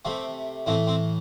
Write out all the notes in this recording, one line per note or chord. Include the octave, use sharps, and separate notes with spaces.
C3 A3 C4
A2 E3 A3 C4
C4